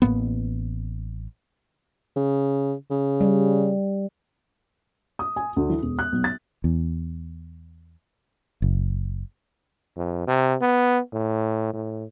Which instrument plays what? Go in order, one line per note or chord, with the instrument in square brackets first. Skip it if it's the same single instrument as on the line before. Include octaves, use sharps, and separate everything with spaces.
[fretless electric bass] A1 A2 A#3 B3
[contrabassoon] C#3
C#3
[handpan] G3
[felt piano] D#6
G#5
D2
E3
E1
F#6
B1
A6
[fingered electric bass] E2
F#1
[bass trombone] F2
C3
B3
A2
A2